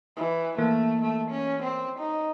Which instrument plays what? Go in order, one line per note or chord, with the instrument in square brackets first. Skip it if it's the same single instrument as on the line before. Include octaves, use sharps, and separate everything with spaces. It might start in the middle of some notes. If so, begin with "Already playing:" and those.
[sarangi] E3
[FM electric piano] E3 A#3 [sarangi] A3
[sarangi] A3
C#4
C4
D#4